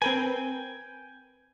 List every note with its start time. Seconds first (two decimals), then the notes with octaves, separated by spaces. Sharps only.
0.02 C4 A#4 B4 G5 G#5